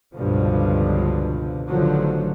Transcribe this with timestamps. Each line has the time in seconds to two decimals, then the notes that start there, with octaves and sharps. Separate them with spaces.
0.15 C#2 G2 B2 D3 F3
1.69 A1 D3 D#3 F3 F#3